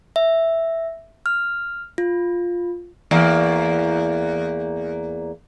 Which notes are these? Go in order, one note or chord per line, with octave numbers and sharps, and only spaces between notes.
E5
F6
F4
E2 A#3